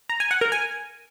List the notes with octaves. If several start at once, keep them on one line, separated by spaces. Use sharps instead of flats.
A#5
G#5
F#5
A#4
G#5